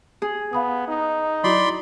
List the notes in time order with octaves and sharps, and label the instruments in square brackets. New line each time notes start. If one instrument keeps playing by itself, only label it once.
[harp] G#4
[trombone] B3 [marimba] F5 B5 D#6
[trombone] D#4
[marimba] F#3 E4 F#4 [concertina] D5 B5 C6